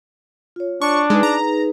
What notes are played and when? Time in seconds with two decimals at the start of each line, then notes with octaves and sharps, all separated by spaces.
0.56 F4 C#5
0.82 D4 C#6
1.10 G#3 D#4 G#4 B4
1.23 A#5